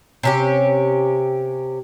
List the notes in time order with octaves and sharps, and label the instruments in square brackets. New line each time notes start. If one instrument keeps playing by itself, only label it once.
[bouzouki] C3 C#4 G4